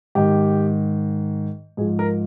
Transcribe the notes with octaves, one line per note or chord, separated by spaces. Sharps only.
G#2 D#3 G4
G#2 F3 G#4
A#4